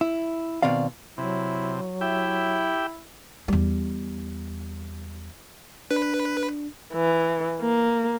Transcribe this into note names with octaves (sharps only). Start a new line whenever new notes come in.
E4
B2 D#3 C4 D5 F5
C3 F#3 E4
E4 G4 E5 G5
E2 G3
D4 B4
E3
A#3